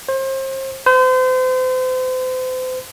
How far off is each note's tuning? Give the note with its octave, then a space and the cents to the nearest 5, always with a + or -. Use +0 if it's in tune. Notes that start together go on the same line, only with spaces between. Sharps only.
C5 +35
C5 -35